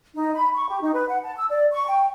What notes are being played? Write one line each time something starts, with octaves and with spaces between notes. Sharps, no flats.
D#4
B5
C#6
G4
D#4
B4
F#5
A5
E6
D5
C#6
G5